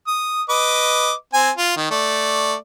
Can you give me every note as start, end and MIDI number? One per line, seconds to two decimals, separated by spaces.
0.07 0.42 87
0.49 1.13 71
0.49 1.13 75
0.49 1.13 86
1.34 1.50 60
1.34 1.50 80
1.57 1.73 65
1.77 1.90 51
1.91 2.55 57
1.91 2.55 74